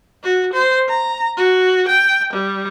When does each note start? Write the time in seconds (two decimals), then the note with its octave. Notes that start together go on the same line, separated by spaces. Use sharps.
0.23 F#4
0.53 C5
0.88 A#5
1.37 F#4
1.88 G5
2.33 G3